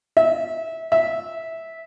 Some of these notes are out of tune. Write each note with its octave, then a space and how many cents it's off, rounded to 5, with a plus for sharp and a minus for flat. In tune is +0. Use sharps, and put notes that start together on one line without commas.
E5 -25
E5 -15